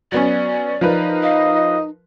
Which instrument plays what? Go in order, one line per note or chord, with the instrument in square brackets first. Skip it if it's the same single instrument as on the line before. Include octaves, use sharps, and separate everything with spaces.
[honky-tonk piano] F#3 B3 C#4 [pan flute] D5
[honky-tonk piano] F3 A#4 B4 [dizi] D#4
[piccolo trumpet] D#5 [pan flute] F5